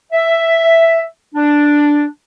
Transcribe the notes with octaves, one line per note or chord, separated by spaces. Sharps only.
E5
D4